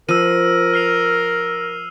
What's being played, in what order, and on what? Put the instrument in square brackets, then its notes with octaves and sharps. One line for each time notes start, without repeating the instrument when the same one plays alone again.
[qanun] F3 [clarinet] A#4 [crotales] E6 D#7
[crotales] F6 C7 F7